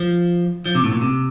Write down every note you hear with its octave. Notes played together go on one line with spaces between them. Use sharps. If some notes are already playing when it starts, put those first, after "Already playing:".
Already playing: F3
F3
C3
A2
A#2
C3